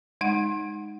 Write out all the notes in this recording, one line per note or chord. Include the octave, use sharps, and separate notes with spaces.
G#3 D#4 F#5